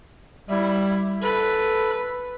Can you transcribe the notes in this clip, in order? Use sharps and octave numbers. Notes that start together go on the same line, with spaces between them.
G3 E4
A4 B4